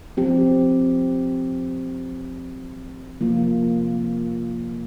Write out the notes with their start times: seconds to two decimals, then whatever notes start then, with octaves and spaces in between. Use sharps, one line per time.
0.17 F3 C4 G4
3.20 C3 F3 A#3 F4